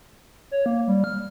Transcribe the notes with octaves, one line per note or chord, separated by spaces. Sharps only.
C#5
A#3
G3
F6